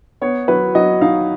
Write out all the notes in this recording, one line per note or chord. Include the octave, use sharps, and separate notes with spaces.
B3 C#5
F#3 B4
F#3 D#5
D#4 F5